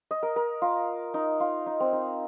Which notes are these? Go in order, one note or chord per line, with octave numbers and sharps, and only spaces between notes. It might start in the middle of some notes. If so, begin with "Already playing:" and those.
D#5
A#4
A#4
F4
D#4
F4
D#4
C4
D#4